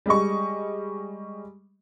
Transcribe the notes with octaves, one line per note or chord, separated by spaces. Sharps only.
G3 G#3 D#5 C#6